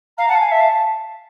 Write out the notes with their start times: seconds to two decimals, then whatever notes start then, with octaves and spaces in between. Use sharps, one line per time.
0.18 F5 A#5
0.29 F#5 A5
0.35 F5 G#5
0.51 E5 A5
0.60 F5